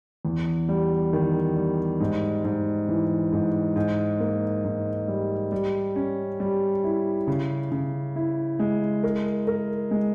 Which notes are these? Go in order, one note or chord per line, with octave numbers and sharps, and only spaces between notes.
E2
G3
D#3
G3
G#2
G#2
E3
G#2
G#2
A#3
G#2
G3
G3
C#4
G3
E4
C#3
C#3
E4
G#3
A#4
A#4
G#3